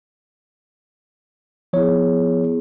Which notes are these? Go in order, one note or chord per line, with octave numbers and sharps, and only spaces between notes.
F3 B3 E4 G#4 C#5